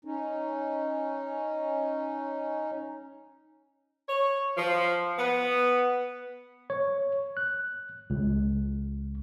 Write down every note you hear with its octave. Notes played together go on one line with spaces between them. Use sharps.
C#4 D#4
C#5
F3
B3
C#5
F#6
C#2